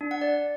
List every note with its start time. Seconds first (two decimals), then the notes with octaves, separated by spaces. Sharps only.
0.01 D4
0.11 F#5
0.21 D5